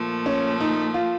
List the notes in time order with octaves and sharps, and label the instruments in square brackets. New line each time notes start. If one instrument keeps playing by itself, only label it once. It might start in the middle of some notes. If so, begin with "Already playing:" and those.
Already playing: [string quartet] A#2 F3 A3
[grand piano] C#4
D#4
F4